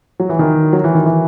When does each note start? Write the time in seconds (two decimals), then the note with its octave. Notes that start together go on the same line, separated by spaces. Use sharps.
0.20 F#3
0.29 E3
0.39 D#3
0.73 F#3
0.84 E3
0.95 D#3
1.06 E3